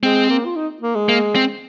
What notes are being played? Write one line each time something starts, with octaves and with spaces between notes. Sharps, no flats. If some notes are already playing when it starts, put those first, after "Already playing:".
G#3 C4
A#3
F4
D#4
A#3
G#3
A#3
C4